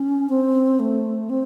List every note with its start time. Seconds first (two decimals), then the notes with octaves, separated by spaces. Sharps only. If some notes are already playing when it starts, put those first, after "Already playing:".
Already playing: C#4
0.29 C4
0.80 A3
1.30 C4